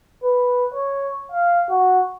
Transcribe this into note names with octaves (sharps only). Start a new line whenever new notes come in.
B4
C#5
F5
F#4